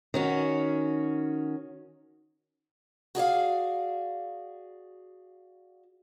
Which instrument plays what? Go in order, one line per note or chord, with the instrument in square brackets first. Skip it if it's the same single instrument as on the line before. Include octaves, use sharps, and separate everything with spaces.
[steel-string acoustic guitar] D#3 C#4 F#4
F#4 G#4 D5 F5